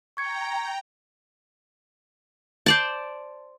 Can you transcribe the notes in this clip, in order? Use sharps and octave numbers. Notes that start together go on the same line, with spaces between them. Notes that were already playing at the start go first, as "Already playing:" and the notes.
G5 A#5 C#6 G#6 C#7
C5 D5 A5